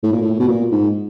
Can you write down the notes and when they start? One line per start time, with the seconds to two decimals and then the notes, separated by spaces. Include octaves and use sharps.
0.03 A2
0.12 A#2
0.21 A2
0.40 B2
0.48 A#2
0.71 G#2